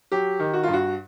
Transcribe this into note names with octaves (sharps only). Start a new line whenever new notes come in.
F#3 G4
D#3
F#4
G2 F4
F#4